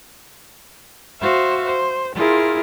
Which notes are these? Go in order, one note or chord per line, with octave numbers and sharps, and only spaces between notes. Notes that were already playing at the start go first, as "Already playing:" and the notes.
F#4 C5 E5 F5
C5
E4 F4 G#4 A#4